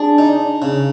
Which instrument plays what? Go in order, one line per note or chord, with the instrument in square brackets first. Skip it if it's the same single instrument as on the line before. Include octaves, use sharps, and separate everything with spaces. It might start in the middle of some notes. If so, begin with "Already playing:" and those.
Already playing: [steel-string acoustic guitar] D4 [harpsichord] G#4
[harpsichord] D#4
C#3